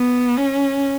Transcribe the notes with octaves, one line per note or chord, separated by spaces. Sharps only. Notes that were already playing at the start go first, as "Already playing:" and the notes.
Already playing: B3
C#4